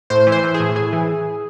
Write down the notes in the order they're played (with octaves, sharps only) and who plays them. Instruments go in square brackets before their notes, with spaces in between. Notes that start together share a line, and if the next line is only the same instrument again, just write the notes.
[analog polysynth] A2 C5
E3
C5
E3
G#4
A2
A2 G#4
E3